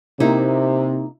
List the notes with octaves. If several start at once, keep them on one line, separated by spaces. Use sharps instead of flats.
C3 A#3 D#4 E4